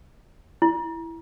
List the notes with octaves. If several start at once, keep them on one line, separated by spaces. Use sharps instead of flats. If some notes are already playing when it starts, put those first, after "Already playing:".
E4